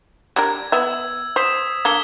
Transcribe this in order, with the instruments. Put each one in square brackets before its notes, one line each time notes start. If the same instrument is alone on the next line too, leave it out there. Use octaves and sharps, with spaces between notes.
[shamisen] G3 D4 A#4 [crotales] G#6
[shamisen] B3 E5 [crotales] E6 G#6
[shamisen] C5 [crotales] D#6 B6 E7
[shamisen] D3 A#3 A4 [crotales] G#6 G7